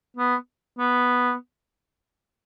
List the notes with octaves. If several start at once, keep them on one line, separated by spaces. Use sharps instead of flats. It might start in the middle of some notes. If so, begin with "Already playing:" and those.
B3
B3